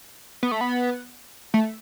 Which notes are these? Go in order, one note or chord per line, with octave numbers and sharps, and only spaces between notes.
B3
A3
B3
A3